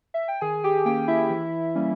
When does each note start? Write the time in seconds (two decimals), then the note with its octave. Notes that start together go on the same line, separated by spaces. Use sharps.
0.14 E5
0.28 G5
0.41 D#3 G#4 G#5
0.64 G4 G5
0.85 A#3 C#4 G4 G5
1.08 E4 E5
1.30 E3
1.75 G3 A#3 C#4